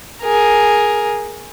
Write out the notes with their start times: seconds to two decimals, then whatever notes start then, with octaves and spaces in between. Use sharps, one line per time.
0.22 G#4 A#4